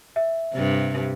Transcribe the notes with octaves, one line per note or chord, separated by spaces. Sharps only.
E5
G2 C3